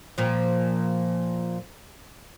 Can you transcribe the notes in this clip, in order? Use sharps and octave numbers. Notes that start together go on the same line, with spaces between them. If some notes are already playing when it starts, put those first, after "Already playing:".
A#2 F3